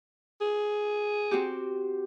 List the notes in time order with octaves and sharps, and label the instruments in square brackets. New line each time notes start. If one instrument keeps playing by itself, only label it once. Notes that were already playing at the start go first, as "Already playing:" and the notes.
[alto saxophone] G#4
[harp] C4 F#4 G4